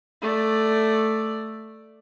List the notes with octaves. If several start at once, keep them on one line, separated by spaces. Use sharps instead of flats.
A3 D5